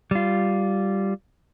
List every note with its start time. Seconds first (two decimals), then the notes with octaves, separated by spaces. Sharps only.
0.11 G3 F4